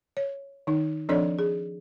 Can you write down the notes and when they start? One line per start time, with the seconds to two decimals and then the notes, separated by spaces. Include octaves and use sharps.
0.17 C#5
0.67 D#3 D#4
1.09 F3 C4 D4 A4 C#5 D5
1.39 G#4